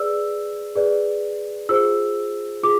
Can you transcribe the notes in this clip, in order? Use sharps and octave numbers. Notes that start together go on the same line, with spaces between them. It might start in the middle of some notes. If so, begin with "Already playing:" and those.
Already playing: G#4 B4 D5 E6
G#4 B4 D5
F4 G#4 C5 E6
F4 G#4 D6